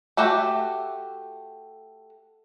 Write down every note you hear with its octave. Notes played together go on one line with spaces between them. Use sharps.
A3 F#4 G4 E5